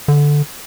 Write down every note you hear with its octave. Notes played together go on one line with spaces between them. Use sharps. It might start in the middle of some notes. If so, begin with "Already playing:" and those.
D3